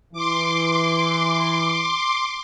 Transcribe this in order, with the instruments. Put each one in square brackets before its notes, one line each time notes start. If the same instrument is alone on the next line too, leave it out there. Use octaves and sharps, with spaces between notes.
[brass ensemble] E3 [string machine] C6 D6